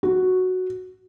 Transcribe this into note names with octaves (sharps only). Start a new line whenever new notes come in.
F#4